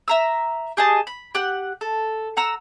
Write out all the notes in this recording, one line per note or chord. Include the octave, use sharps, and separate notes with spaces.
E5 A#5 E6
G4 G#4 D#5 A5
B5
G4 F#5
A4
F#5 A#5 E6